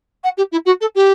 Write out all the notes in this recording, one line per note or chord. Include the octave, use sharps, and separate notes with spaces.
F#5
G4
E4
F#4
A4
G4